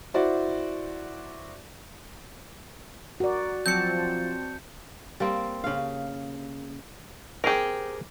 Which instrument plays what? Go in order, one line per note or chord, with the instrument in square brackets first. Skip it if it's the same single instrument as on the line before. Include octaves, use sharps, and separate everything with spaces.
[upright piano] E4 F#4 C5 D5
[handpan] F#4 D5 [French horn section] A#4
[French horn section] F3 [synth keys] F#3 C4 A5 [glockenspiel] G6 C#7
[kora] G3 A#3 C4
C#3 F5
[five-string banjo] C4 G4 [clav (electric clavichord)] G#4 A#4